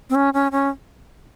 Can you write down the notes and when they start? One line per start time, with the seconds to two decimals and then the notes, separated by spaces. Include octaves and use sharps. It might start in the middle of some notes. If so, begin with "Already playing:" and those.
0.10 C4
0.15 C#4
0.34 C#4
0.52 C#4